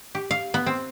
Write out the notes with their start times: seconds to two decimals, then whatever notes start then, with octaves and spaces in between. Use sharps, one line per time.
0.15 G4
0.31 F5
0.54 B3
0.66 C4